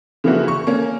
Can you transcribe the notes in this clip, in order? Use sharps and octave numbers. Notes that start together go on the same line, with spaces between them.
C#3 E3 F3 A#3 E4 F#4
C#6
A#3 C#4